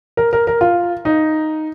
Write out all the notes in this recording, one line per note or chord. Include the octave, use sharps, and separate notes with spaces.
A#4
A#4
A#4
F4
D#4